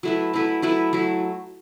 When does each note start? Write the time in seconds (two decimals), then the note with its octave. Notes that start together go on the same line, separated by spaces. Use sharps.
0.03 F#3 A3 E4 B4
0.33 F#3 A3 E4 B4
0.62 F#3 A3 E4 B4
0.93 F#3 A3 E4